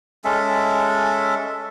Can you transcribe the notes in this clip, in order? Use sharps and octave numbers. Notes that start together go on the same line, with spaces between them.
G#3 C#4 A4 E5